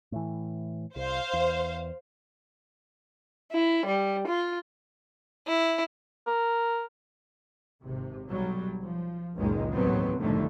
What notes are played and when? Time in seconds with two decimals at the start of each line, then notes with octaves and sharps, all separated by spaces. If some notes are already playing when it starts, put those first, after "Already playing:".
0.12 A2 E3
0.96 C2 C5 F5
1.33 E2
3.52 E4
3.88 G3
4.28 F4
5.47 E4
6.27 A#4
7.83 G#1 C3
8.27 B1 F#3 G3
8.80 F3
9.35 F#1 C#2 F#2 A#2 D#3 G#3
9.73 A1 D#2 B2 F#3 B3 C4
10.18 C2 F2 A2 D3 D#3 A3